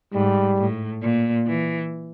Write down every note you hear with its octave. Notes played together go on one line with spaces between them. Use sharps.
G#2 G3
A2
A#2
E3